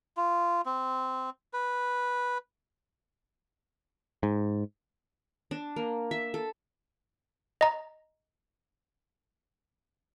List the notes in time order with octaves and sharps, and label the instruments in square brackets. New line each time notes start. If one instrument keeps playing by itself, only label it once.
[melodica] F4
C4
B4
[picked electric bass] G#2
[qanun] D4
A#3
E5
A4
[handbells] D#5 A#5